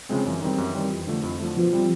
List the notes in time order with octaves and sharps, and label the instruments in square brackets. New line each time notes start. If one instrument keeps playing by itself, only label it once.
[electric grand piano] C#3 F3 G#3 C4
[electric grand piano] F#2 [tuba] E3
[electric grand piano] D#3 G3 C4
F#2
D#3 G3 C4
F2
D3 F3 A3
F2
D3 F3 A3
[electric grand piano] B2 [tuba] F3
[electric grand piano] G3 C4